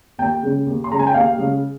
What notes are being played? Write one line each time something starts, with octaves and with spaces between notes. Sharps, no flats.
D#2 G5
C#3 G#3
D#2
C6
C#3 G#3 A#5
G#5
G5
D#2 F5
C#3 G#3